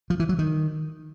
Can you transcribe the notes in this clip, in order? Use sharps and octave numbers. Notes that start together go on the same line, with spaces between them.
F3
E3
F#3
D#3